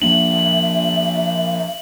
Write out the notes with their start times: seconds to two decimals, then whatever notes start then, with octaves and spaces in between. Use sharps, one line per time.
0.02 F3 A#3 D4 E5 F#7